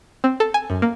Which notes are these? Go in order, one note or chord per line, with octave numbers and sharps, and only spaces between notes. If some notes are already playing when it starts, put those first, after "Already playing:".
C4
A4
G#5
F#2
A#3